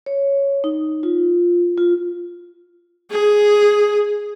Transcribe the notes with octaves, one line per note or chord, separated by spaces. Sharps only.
C#5
D#4
F4
F4
G#4